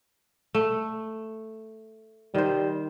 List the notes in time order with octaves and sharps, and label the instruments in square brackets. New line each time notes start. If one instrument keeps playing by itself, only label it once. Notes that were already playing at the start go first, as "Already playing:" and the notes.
[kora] A3
[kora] D#3 C5 [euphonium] G3